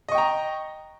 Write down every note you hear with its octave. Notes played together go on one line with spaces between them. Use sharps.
D#5 G5 A#5 C#6